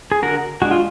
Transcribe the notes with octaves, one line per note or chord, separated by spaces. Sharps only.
G#4
D3 F#4 A#4
G#3 D4 F#4
F4